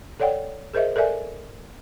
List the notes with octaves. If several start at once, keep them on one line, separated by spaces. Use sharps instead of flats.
A4 C#5 D5 F#5 G5
G#4 A#4 C5 D#5 E5
A4 A#4 D5 E5 G#5